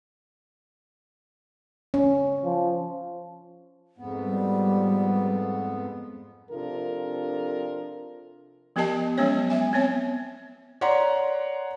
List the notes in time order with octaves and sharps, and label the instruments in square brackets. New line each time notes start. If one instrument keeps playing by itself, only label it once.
[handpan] C#4
[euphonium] F3
[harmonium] F2 G#2 B3
[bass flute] G3
[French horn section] C3 F3 D4 F4 A4 A#4
[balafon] F3 B3 G4 A#4 D#5 A5
F#3 G#3 B3 C#4 C#5
E5 G#5
B3 C4 C#5
[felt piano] C#5 D5 F#5 A#5 C6